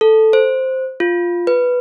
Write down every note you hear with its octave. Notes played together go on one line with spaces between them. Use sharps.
A4
C5
F4
B4